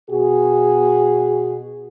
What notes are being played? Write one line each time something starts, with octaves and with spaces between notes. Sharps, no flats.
B2 F#4 G#4